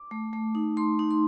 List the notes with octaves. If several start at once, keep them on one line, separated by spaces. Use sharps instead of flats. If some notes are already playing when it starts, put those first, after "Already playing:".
Already playing: D6
A3
A3
D#4
A3 C6
D#4
C6